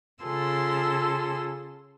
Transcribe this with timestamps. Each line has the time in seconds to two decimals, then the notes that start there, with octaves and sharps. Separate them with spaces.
0.24 C#3 F4 G#4 A4 C6 E6